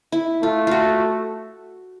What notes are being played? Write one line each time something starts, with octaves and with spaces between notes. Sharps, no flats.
E4
A3 F4
F4 F#4